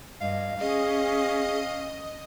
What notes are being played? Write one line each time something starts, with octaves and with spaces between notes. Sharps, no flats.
G2 D#5 F5
C#4 G#4 D#5